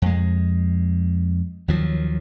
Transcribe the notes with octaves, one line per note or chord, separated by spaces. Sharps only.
F2 G#3
D#2 D#3 F3 F#3